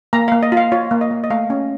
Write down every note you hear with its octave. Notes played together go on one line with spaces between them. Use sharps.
A#3 A#5
A#3 F5
D#5
F4 F5
F4 C#5
A#3
D#5
A#3
D#5
A3 F5
C#4